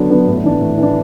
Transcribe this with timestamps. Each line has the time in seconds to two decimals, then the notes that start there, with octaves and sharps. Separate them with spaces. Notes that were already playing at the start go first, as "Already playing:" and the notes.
Already playing: D3 F#3 B3 D4
0.10 F#3 B3 D4
0.27 A2
0.44 E3 D4
0.61 A2
0.78 E3 D4